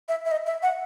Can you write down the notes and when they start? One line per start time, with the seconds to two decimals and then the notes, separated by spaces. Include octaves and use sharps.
0.09 E5
0.25 E5
0.31 D#5
0.46 E5
0.62 F#5